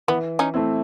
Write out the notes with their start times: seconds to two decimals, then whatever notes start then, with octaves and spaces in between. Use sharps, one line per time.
0.08 E3 B3
0.39 C#4 D#4
0.54 A3 C4 E4